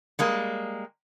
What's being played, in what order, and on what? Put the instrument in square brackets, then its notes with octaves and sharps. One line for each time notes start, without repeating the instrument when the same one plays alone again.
[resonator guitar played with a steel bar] G3 G#3 A#3